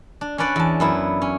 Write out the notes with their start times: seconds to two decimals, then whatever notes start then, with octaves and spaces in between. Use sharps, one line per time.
0.21 D4
0.38 C#4 D4 B4 D5 F#5
0.56 E2 A5
0.80 F#2 B3 E4
1.22 C#4